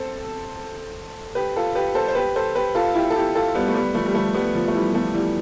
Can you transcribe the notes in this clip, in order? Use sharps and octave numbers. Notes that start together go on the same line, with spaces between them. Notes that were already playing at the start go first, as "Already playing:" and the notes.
Already playing: C4 A4 C5
G4 B4
F4 A4
G4 B4
A4 C5
C5
G4 B4
A4 C5
G4 B4
F4 A4
E4 G4
A4
E4 G4
F4 A4
G3 B3
A3
G3 B3
F3 A3
G3
F3 A3
G3 B3
F3
A3
E3 G3
F3 A3
E3 G3